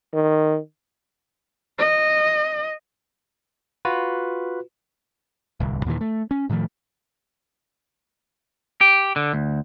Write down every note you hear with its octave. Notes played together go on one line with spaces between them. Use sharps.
D#3
D#5
F4 F#4 B4
D1 C2
D#2 A#2 D#3 E3
A3
C#4
A2 D#3 F3 A3
G4
D3
D2